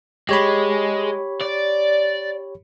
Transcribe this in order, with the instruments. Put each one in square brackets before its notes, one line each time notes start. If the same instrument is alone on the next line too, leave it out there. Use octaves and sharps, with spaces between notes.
[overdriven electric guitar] G#3 [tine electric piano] G4 C#5 B5
[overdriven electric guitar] D5